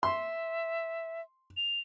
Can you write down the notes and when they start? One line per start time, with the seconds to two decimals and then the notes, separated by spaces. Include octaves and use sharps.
0.03 E5 C6
1.57 F7